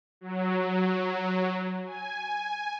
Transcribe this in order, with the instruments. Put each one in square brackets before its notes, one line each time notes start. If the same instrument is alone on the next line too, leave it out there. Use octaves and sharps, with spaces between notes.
[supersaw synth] F#3
G#5